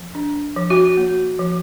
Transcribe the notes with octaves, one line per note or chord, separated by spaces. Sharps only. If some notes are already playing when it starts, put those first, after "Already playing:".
Already playing: F3
D4
F3
F#4
A#3
F3